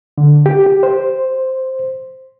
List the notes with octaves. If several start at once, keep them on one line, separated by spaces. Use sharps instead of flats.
D3
G4
G4
C5